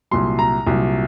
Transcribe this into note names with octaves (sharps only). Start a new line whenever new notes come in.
C2 A#2 F#3 C6
A#5
C2 A#2 F#3